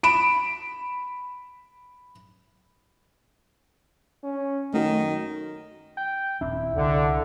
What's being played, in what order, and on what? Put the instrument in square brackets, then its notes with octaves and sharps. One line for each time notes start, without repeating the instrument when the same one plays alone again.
[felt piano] B5 D7 E7
[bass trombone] C#4
[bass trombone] F#2 [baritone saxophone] D#3 [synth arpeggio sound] A3 F#4
[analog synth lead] G5
[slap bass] D#1 C4 D4 [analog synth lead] E4
[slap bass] C2 [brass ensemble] D3